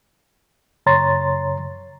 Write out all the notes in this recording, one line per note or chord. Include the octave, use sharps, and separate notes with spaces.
F#2 C#3 C#5 A#5 C6 A6